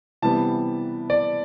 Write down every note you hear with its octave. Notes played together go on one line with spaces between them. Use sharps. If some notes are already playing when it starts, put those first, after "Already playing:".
C3 E3 G3 B3 A5
D5